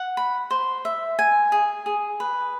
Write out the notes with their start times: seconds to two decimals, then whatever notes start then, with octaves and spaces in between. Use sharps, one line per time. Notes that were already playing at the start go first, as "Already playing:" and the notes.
Already playing: F#5
0.17 B5
0.51 C5
0.85 E5
1.19 G#5
1.52 G#4
1.86 G#4
2.20 B4